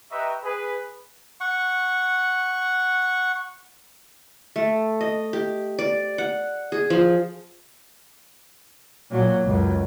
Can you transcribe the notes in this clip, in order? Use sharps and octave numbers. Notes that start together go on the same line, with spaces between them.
G4 B4 D#5 E5 A#5 C#6
G#4 B4
F#5 C#6
A3
D#5
G4
D5
F#5
G#4
F3
A#2 F#3
C#2 F#2